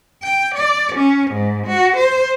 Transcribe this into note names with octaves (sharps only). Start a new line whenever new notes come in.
G5
D5
C#4
G#2
F#4
C5